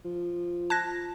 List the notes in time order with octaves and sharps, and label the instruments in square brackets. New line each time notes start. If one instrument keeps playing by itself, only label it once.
[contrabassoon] F3
[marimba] F4 G#6 [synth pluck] A5 F#6 A#6